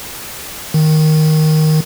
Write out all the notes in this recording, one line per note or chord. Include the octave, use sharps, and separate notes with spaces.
D#3